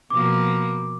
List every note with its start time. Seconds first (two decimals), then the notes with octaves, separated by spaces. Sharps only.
0.10 B2 F3 A#3 D6